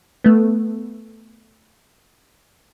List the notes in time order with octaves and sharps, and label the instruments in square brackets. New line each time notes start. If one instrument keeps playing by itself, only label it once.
[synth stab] A3 B3